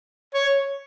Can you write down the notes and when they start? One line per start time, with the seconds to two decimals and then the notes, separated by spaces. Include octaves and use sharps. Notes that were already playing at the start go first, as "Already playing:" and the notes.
0.34 C#5